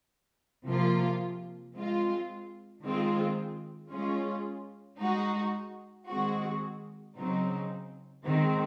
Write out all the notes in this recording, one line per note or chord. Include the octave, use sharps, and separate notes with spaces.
C3 F3 A#3 F4
G#3 C4 F4
D#3 G#3 C4 F4
G#3 C#4 F4 G#4
G#3 D#4 F#4
D#3 G#3 C4 F#4
C#3 F#3 C4 D#4
D#3 G#3 C4